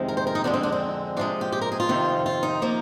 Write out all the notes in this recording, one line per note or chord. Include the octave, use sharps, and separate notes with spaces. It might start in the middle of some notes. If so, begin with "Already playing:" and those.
Already playing: F2 C3 D#3 G#3
A#4
C5
A#4
D#4
F2 D3 G#3 D4
C4
D4
C4
C3 F3 G#3 D4
G4
G4
A#4
G#4
F4
F2 C3 D#3
F4
D#4
F3 A#3